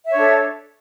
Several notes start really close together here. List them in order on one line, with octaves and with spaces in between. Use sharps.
E5 C#5 D4 A4